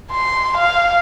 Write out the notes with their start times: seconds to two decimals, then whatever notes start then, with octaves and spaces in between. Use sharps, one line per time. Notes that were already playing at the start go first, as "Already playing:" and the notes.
0.11 C6
0.57 F5